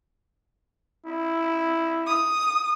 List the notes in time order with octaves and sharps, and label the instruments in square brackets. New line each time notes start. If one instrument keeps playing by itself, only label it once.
[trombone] E4
[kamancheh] D#6